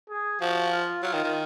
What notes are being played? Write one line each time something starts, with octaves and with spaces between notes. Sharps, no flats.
G#4
F3 F#4
F4
F#3 F4
D#3
D#3